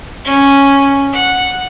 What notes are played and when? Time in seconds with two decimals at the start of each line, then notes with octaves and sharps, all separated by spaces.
0.25 C#4
1.13 F#5